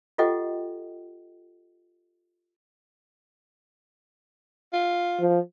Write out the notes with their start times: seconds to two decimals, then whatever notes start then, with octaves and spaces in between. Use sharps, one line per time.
0.18 F4 G4 A4 D#5 F#5 G5
4.73 F4
5.21 F3